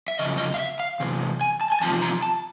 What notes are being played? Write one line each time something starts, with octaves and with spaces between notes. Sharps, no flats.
E5
F2 C#3 D#5
D#5
F5
E5
F5
E2 C3
G#5
A5
G#5
E2 C3 F3 A5
A#5
A5